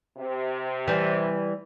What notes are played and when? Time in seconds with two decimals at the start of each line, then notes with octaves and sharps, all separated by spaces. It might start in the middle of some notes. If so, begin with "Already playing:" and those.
0.17 C3
0.88 E3 G3